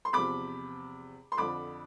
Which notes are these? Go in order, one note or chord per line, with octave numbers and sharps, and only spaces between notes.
C6
E2 C3 F3 B5 D6
C6
F2 D3 F3 B5 D6